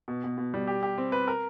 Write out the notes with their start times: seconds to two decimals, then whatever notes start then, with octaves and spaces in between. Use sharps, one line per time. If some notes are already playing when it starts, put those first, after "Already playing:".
0.08 B2
0.24 B2
0.38 B2
0.54 G3
0.67 G4
0.83 G4
0.98 C4
1.12 B4
1.28 A#4